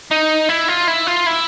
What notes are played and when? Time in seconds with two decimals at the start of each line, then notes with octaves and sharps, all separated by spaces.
0.11 D#4
0.49 E4
0.68 F4
0.88 E4
1.07 F4
1.26 E4